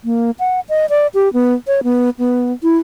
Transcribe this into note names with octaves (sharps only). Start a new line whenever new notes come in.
A#3
F#5
D#5
D5
G4
B3
C#5
B3
B3
E4